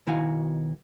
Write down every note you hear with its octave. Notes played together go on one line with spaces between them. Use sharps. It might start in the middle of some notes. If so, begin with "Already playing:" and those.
B1 D#3 E4 F#4 F5 G#5